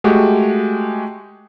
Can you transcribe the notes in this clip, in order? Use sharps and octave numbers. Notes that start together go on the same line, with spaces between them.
G#3 A3 F#4 G4